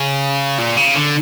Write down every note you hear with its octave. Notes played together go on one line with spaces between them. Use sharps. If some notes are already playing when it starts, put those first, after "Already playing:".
Already playing: C#3
A#2
C#3
D3